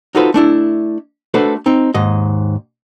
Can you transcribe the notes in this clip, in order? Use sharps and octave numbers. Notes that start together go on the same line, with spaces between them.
D#4 F4 F#4 A4 B4 C5
A3 D4 E4
A3 D4 F#4 A4 B4 C5
C4 D#4
D#2 G#2 D#5